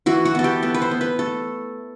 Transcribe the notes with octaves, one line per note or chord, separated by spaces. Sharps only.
E3 F#4
F#4
B3 A4
G4
B3 A4
B4
C5
B3
B4
A3 A4